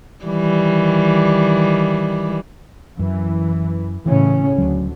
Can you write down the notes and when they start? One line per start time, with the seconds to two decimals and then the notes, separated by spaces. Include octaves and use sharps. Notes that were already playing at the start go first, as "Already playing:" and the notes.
0.25 D#3 E3 G3
2.99 F#2 E3
4.06 A2 C#3 E3 C#4
4.58 D2 F#3